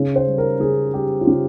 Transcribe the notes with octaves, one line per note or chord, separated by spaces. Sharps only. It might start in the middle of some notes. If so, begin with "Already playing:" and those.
Already playing: C#3
C5
G3
A#4
C#3 G#4
G3 G4
F4
C#3 G4